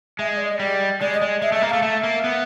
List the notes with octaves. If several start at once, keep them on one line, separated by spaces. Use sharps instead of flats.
G#3 E5
D#5
D5
D#5
G3 D5
G#3 D5
D#5
G#3
G#3 E5
A3 E5
A#3
A3 F5
A3 E5
A#3
B3